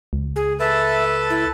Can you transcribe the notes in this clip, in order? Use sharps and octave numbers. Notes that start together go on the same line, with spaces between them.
C#2
G#4
A4 B4 E5 A5
E4